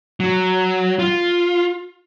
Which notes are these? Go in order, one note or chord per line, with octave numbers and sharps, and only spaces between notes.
F#3
F4